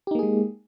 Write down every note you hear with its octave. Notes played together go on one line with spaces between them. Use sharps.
G#3 A#3 D#4 G4 G#4